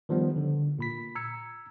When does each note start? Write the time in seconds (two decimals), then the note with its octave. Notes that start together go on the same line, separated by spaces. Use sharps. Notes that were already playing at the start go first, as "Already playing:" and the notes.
0.09 D#3 F3 G3 B3
0.36 D3
0.79 A#2 B5 B6
1.15 A#5 E6 G#6 C#7